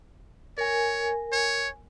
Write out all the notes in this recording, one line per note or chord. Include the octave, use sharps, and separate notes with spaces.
A#4 C#5 G#5
C#5